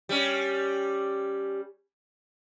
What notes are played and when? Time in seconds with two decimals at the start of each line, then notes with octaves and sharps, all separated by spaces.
0.09 G3 C#4